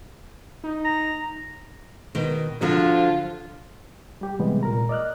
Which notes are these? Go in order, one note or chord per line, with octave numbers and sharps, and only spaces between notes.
D#4
A#5
B2 D#3
D3 F3 F4 F#4
G3 G4
A2 C3 E3 G3 G#3 B3
A#2 A#4 A#5
D5 D#5 F6 F#6